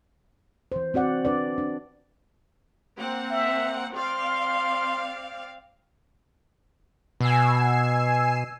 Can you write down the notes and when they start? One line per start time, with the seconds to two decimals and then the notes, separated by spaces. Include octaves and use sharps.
0.72 E3 C5
0.94 C4 F#4 D5 F#5
1.25 D4 B4 D5
1.58 D4
2.97 A#3 C4 F#5
3.31 E5
3.93 C4 D5 F5 C6
7.21 B2 G#5 E6 C7